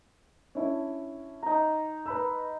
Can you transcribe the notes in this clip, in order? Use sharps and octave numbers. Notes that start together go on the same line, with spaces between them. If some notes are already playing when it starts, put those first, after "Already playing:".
C#4 D4 E4
D#4 A#5
B4 B5 E6